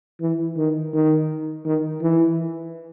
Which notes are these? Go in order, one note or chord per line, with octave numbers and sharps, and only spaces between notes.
E3
D#3
D#3
D#3
E3